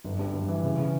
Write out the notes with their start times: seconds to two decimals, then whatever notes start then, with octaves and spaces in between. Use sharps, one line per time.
0.04 G1
0.19 G2
0.34 G1
0.49 E3
0.63 C#3
0.78 C#3